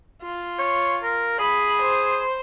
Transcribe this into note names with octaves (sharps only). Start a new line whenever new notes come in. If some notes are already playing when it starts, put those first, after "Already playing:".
F4
C#5
A#4
G#4 B5
C5